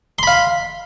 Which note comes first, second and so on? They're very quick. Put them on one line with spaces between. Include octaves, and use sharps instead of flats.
C6 B5 F5